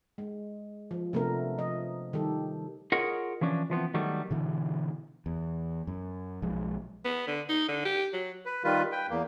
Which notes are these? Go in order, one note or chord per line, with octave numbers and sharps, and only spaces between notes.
G#3
F3
C3 F3 A3 B3 D4 A#4
F3 D#5
D#3 G3 G4 A4
F4 G#4 A#4 C#5 D#5 F#5
E3 F3 C#4 D4
E3 F3 B3 C4
D#3 F#3 G3 A3 B3
B2 D3 E3
E2
F#2
B1 F3 G#3
B3
D3
D#4
D3
G4
F#3
B4
D#3 G3 F4 B4
B4 G5
E2 A#3